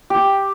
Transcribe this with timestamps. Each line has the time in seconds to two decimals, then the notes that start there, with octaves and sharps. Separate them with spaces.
0.10 G4